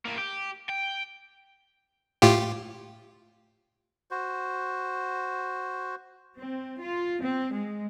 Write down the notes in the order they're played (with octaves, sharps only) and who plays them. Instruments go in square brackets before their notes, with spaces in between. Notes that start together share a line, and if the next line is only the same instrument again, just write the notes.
[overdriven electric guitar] A2 A#3
G4
G5
[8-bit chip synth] A2 F4 G4
[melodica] F#4 C5
[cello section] C4
F4
C4
G#3